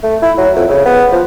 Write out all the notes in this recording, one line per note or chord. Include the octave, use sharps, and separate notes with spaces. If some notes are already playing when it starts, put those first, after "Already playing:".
A3
E4
F#3
F2
C#3
B3
F3